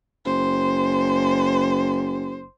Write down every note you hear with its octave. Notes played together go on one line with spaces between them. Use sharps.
F#1 C5